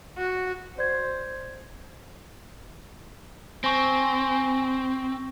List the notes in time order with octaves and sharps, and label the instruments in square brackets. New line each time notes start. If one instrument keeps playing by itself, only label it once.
[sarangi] F#4
[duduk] C5 [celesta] D5 G#6
[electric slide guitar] C4 [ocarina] G#5 [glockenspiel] C#6 A#6